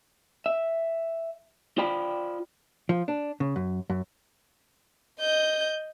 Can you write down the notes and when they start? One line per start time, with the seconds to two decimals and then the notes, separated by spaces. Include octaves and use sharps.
0.46 E5
1.78 F4 C5 D5 G5 B5
2.89 F3
3.08 D4
3.40 C#3
3.56 F#2
3.90 F#2
5.20 D#5 G6